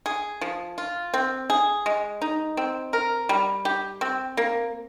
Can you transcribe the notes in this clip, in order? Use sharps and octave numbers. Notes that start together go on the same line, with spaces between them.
G#4
F3
F4
C4
G#4
G#3
D#4
C4
A#4
G3
G4
C4
A#3